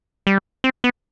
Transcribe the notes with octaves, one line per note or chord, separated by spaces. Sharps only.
G3
C4
B3